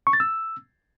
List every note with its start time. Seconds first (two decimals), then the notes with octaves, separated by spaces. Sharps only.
0.07 C#6
0.13 A6
0.20 E6